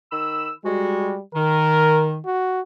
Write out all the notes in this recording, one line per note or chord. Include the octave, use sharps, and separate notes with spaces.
D#3 B5 E6
G3 G#3 F#4
D#3 A#4
F#4